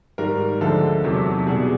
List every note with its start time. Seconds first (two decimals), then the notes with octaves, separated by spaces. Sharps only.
0.18 G#2 D#3 G3 A#4
0.61 D2 D3 F3 G#3 A4
1.04 E2 C3 D#3 F#3
1.46 E2 B2 G3 G#4